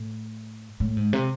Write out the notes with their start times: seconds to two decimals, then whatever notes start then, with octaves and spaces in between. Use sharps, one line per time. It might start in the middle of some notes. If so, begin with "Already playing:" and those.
Already playing: A2
0.80 A2
0.97 G#2
1.13 C3